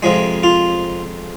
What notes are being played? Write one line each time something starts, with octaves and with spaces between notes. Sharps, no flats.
F2 C3 F3 G#3
F4